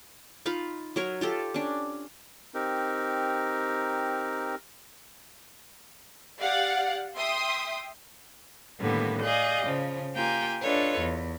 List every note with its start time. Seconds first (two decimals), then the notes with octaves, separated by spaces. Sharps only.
0.46 D#4 F4 F5 B5
0.96 F#3 A#4 C#5
1.21 F4 G4 A4
1.54 C#4 D4
2.54 C4 D#4 G4 A#4
6.40 G4 D5 F5 F#5
7.17 E5 G5 C6 D#6
8.80 A2 D3 D#3 G3 A#3 B3
9.22 G#4 D5 D#5 F5 G6
9.64 C#3 F3
10.13 A#3 F4 G4 G5 G#5 A#5
10.62 D4 F4 A4 B4 C#5 D#5
11.00 E2